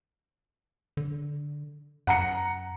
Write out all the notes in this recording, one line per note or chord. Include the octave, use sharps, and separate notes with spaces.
D3
F#2 F#5 A#5 C#7